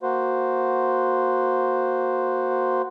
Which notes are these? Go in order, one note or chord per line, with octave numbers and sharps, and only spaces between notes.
A#3 F#4 C5